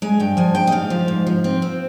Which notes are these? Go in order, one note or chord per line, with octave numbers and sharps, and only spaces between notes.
G#3 G#5
G2 G5
F3 G#5
G2 G5
D#5
G#2 F5
F3
G#2
F3
C4
C4